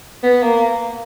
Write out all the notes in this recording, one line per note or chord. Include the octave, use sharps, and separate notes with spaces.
B3
A#3